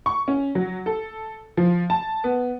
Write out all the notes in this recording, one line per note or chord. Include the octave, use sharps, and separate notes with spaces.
C#6
C#4
F#3
A4
F3
A5
B3